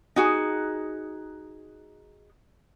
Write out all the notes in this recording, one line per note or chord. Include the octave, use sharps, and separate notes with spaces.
D#4 F#4 G#4